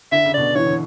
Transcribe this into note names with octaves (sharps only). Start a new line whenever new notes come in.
D3 E5
C#3
B2 D3 D5
E3 C#5
D3